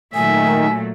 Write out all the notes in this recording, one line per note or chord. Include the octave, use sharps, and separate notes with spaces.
A#2 D#3 F#3 A3 E5 G#5